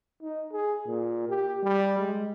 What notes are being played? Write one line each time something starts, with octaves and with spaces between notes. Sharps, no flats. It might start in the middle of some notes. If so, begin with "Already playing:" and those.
D#4
G#4
A#2
G4
G3
G#3